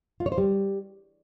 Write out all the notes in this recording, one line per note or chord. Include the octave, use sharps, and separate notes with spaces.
F4
C#5
C5
G3